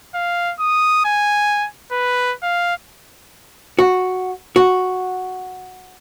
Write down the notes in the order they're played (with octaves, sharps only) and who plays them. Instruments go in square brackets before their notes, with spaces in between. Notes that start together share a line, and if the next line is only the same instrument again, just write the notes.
[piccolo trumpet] F5
D#6
G#5
B4
F5
[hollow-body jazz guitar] F#4
F#4